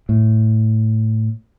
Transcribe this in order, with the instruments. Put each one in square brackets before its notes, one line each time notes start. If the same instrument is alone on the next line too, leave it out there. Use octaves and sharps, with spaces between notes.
[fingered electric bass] A2